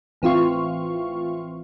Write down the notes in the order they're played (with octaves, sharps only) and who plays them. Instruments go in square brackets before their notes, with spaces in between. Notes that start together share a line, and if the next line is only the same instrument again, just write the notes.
[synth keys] A1 E3 C4 F4 F5 C#6